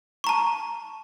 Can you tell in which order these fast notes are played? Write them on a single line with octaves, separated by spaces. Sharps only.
C#6 A#5 A5